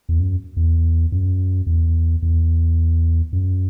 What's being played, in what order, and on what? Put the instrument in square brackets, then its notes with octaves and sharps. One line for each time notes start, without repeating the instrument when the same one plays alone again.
[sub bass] E2
F#2
E2
F#2
E2
E2
F#2